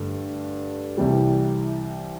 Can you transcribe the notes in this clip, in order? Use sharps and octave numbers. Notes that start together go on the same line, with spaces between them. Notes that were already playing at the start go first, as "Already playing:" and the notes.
Already playing: G2 D3 A3
C2 C3 E3 G3